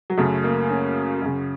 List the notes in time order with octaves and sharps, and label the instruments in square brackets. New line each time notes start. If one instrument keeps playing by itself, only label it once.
[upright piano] F#3
F#2 C#3 A3
A#3
C#4
F#2 C#3